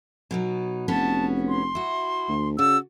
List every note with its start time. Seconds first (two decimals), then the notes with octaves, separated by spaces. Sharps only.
0.31 B2 F#3 D#4
0.88 F1 B3 C#4 F#4 A5
1.49 C6
1.75 E4 F#4
2.29 D2
2.59 C#3 F#4 D5 E6